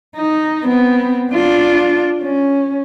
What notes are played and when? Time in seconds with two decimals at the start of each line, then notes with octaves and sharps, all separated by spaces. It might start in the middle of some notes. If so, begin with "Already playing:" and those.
0.16 D#4
0.65 B3 C4
1.33 D4 F4
2.22 C#4